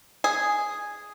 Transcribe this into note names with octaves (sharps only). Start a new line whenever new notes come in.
G#4